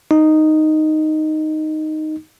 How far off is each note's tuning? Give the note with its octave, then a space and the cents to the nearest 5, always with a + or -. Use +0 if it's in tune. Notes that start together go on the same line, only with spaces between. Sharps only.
D#4 -5